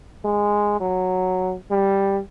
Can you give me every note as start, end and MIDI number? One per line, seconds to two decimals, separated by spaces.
0.25 0.79 56
0.80 1.54 54
1.71 2.20 55